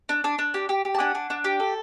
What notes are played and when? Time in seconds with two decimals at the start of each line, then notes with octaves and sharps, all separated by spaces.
0.09 D4
0.24 D4
0.39 D4
0.54 G4
0.69 G4
0.85 G4
0.95 A5
0.99 D4 F#5 G#5
1.15 D4
1.30 D4
1.44 G4
1.60 A4